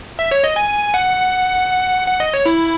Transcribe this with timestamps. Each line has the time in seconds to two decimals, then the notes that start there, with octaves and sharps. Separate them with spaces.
0.19 E5
0.31 C#5
0.44 D#5
0.56 G#5
0.94 F#5
2.08 F#5
2.20 D#5
2.34 C#5
2.46 E4